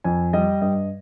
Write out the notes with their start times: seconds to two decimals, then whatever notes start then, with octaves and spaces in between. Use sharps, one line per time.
0.04 F2 G#5
0.33 G3 D#5
0.62 G2 D#5